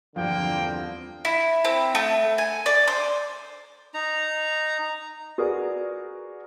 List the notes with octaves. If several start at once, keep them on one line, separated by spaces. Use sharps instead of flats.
E2 G2 D3 F3 A#3 C4 G5
E4
C4
A3
G#5
D5
C5
D#4 A#5
F#4 G#4 A#4 B4 D5